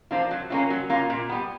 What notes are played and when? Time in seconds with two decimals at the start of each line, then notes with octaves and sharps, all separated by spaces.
0.11 F3 A#3 D4 F4
0.31 F#3
0.50 A#3 C#4 F4
0.70 F#3
0.90 A#3 C#4 F4
1.10 A#2
1.29 G3 B3